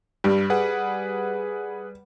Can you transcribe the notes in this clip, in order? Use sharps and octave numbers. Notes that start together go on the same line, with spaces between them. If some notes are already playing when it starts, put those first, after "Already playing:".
G2 G3
G#4 B4 F#5